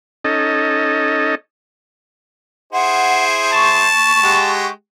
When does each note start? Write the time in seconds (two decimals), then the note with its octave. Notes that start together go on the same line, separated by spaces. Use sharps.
0.25 C#4 D#4 A4 D#5
2.73 E4 G#4 C5 F#5
3.53 A5 C#6
4.23 G#3 G4 F#5